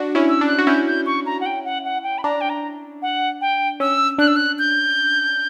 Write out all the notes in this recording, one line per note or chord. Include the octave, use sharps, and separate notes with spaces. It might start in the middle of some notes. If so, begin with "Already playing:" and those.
Already playing: D4 F#4
C#4 E4
E6
D4
F#6
F#4
C#4 E4 G6
G6
C#6
A#5
F#5
G5
F#5
F#5
G5
B5
D4 A#5
G5
A#5
F#5
G5
C#4 E6
D4 F#6
E6
F#6
G6